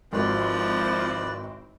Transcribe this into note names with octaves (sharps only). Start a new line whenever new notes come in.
G#1 F3 C4 E4 F#4 B4 D5